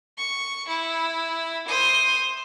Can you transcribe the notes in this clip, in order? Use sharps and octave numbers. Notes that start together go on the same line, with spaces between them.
C#6
E4
C5 D#6